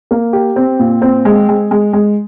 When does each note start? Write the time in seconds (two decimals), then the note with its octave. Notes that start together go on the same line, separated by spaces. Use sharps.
0.11 A#3
0.33 G4
0.56 C4
0.79 A#2
1.02 C4
1.25 G#3
1.49 G#3
1.71 G#3
1.93 G#3